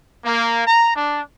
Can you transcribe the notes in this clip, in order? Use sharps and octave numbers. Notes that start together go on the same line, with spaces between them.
A#3
A#5
D4